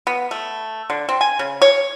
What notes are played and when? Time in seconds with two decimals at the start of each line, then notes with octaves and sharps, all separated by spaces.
0.07 B3
0.31 A3
0.90 D3
1.09 C4
1.21 G#5
1.39 C#3
1.62 C#5